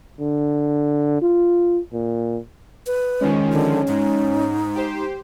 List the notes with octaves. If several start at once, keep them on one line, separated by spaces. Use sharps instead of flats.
D3
F4
A#2
B4
D#3 F3 G#3 C#4
D3
G#2 D#4
G4 C5